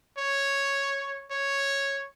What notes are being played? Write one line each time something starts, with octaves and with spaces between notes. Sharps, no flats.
C#5
C#5